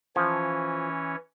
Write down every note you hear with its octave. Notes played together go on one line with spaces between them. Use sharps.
E3 F3 C#4 C#5